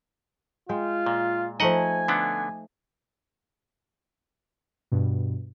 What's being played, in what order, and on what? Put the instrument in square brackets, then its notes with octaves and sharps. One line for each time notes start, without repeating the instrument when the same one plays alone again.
[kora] G#3 G5 [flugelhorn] F4
[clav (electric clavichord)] A#2
[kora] F3 A3 D#4 [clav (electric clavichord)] D#5 F#5 [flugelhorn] G#5
[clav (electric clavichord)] D3 B3 D4
[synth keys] G2 B2